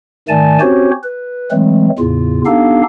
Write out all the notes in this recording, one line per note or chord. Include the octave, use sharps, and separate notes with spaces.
G#2 D#3 A3 D5 G#5 A5
C4 C#4 F#4 G4 C5 C#5
B4
E3 F#3 G#3 A3 C4
E2 A2 C#3 F4
B3 D4 D#4 G4 A4 F5